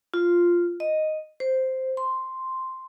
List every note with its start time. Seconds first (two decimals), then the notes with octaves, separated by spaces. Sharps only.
0.14 F4
0.80 D#5
1.40 C5
1.97 C6